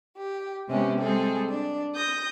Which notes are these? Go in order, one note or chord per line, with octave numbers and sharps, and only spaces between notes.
G4
C3 G#3 B3 C#4 G4
G3 G#3 C4 G#4 A4
D4
D#6 G6 A#6